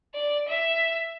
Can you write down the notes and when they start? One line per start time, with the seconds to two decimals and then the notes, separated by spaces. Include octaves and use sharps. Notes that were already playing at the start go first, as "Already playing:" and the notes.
0.15 D5
0.48 E5